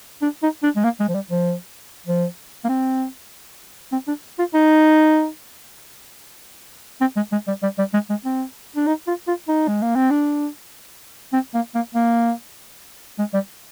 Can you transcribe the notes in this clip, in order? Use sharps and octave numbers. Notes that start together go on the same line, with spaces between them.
D4
D#4
D4
G#3
A#3
G#3
F3
G3
F3
F3
A#3
C4
C4
D4
F4
D#4
C4
G#3
G#3
G3
G3
G3
G#3
G#3
C4
D4
D#4
F4
F4
D#4
G#3
A#3
C4
D4
C4
A#3
A#3
A#3
G#3
G3